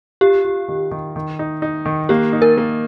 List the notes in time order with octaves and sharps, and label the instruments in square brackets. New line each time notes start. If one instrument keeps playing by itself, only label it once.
[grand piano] F4 [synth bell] G4
[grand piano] F4
D#3
D#3
D#3
D#4
D#4
D#3
[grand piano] A#3 [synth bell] G4
[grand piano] D#4
[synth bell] A#4
[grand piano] A#3